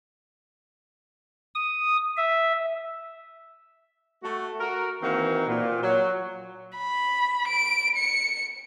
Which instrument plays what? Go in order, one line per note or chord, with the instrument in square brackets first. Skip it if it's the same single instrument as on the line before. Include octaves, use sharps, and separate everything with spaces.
[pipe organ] D#6
E5
[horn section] A3 F#4
F#4 A#4
D#3 E3 A#3 C4 F#4
A#2
F#3
[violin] B5
D7
C#7